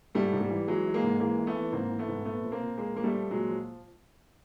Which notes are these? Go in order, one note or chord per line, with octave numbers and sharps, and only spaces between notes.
G#2 G3 A3
G#2
G3
E3
E3 F#3 G#3
E3
G#3 A#3
G#2
E3 G#3 A#3
E3
A3 B3
E3
G#2 A#3 C4
E3
A3 B3
G#2
A#2 A3 B3
F3
A#3 C4
A#2
A#2 G#3 A#3
F3 A#3
G3 A3
F3
A#2 F#3 G#3
F3